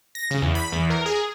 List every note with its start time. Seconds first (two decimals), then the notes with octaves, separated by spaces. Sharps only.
0.15 A#6
0.31 C#3
0.42 E2
0.55 B5
0.72 E2
0.90 A#4
1.06 G#4